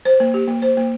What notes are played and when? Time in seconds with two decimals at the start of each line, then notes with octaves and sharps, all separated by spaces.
0.05 C5
0.20 A#3
0.34 G4
0.48 A#3
0.62 C5
0.77 A#3